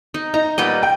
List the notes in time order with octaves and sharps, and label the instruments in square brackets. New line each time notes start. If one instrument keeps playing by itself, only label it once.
[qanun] D#4
[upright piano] D#4 [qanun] A#5
[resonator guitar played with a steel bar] A#2 G3 B3 [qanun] D#5
[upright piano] G5